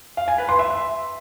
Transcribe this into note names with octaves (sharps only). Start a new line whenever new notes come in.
F5
G#5
B4
C6
E5